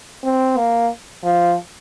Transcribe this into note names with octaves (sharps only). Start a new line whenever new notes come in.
C4
A#3
F3